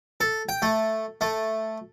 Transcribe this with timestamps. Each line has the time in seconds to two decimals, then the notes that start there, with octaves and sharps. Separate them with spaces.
0.21 A4
0.49 G5
0.62 A3
1.21 A3